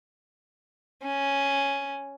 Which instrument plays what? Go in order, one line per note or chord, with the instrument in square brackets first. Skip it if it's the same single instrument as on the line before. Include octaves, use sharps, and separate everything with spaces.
[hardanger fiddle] C#4